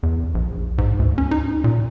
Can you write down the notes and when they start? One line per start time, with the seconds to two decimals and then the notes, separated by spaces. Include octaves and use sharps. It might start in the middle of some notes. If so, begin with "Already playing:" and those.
0.03 E2
0.35 A#1
0.78 G#2
0.99 D2
1.18 C#4
1.31 D#4
1.64 A#2